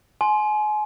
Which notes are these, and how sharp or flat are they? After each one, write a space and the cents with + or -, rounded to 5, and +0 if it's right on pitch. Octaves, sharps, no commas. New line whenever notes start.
G#5 +35 C6 +0